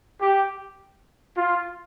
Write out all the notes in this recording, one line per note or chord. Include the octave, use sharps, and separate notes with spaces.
G4
F4